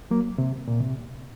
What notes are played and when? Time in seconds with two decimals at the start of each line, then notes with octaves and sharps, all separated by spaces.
0.11 F#3 A#3
0.38 C3
0.68 A#2
0.81 C3